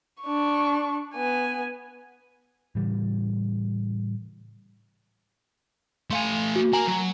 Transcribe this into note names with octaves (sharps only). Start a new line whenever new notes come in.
D4 C#6
B3 G#5
A2 C#3 E3 G3
A3 F5 G#5 C6
F#4
A#3 G#5 A#5 F#7
F#3